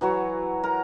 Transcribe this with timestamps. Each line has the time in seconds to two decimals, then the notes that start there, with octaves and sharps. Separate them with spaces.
0.01 E3 F#3 F#4 C#5
0.63 A#4 A#5